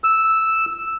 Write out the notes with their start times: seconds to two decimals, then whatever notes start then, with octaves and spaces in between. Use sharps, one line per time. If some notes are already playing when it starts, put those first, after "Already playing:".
0.04 E6